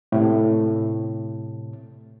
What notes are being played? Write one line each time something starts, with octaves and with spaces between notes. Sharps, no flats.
A2 C3